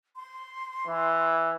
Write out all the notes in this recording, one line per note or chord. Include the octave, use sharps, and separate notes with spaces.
C6
E3